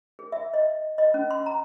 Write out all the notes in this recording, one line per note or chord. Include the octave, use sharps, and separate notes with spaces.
G#4
E5
D#5
D#5
C#4
C6
A#5